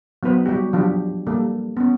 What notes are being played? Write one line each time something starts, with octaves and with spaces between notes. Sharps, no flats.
F#3 B3 D#4 B4 C5
G3 F#4 G4
F3 F#3 D4 G4
G3 A#3 A4
B3 C#4